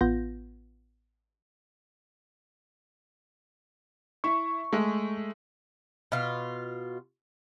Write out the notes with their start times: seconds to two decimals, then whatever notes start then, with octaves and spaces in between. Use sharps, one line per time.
0.01 A1 B3 F4 G6 A#6
4.24 E4 E5 C#6
4.73 G#3 A3
6.12 B2 F4